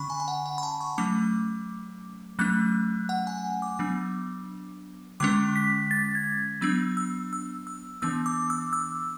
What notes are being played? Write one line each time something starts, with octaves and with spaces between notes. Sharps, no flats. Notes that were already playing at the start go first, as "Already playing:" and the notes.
Already playing: D3 C#4 B5 C#6
G#5
G#5
F#5
F#5
B5
A5
C#6
F#3 A3 C#4 D6
F#3 A3 C#4 F#6
F#5
G#5
D6
F#3 B3 D4
D3 G#3 C#4 D6
B6
A6
G#6
F#3 B3 D4 E6
E6
E6
E6
E3 B3 D4 E6
D6
E6
E6